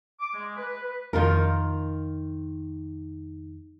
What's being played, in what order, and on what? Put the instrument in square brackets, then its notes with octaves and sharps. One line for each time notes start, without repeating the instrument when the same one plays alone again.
[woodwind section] D6
G#3
B4
B4
[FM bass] F2 [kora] D#3 F4 A#4